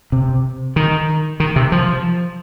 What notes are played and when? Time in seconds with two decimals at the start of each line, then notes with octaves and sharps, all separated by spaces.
0.12 C3
0.76 D#3
1.40 D#3
1.56 C3
1.72 F3